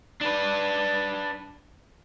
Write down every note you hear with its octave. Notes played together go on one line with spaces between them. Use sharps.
D4 B4